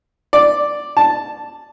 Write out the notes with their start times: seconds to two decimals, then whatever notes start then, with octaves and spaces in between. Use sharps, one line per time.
0.33 D5
0.97 A5